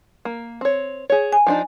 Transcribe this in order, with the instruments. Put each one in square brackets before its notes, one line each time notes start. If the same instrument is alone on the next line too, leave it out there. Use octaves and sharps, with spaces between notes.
[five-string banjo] A#3
C4 C#5
G#4 C#5
[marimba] G#5
[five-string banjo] F3 D4 D#4